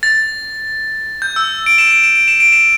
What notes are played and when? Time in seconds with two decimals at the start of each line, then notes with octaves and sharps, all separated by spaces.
0.03 A6
1.22 G6
1.36 E6
1.66 D7
1.78 E7
1.91 D7
2.03 E7
2.15 D7
2.28 E7
2.40 D7
2.52 E7